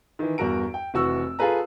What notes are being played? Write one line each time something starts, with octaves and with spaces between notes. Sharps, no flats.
D#3 E3
E2 G2 F#4 A#4 A#5 D7
G5
F1 E3 F#4 C#6 E6
F4 G#4 A4 B4 A#5